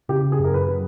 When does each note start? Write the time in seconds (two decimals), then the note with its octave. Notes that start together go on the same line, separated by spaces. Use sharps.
0.09 C#3 G4
0.32 G#4
0.39 F#2
0.44 A#4
0.54 B4
0.69 F#3